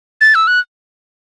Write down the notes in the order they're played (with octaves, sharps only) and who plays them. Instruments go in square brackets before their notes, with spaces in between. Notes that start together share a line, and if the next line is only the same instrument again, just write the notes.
[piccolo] A6
E6
F#6